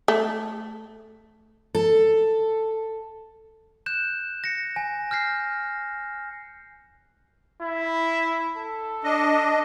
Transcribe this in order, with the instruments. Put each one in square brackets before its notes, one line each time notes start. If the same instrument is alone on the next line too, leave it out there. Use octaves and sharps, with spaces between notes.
[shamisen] A3
[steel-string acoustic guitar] A4
[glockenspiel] F#6 G6 E7
A#6 C#7
G#5
F6 G6 A#6 C7
[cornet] E4
A4
[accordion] D4 D#5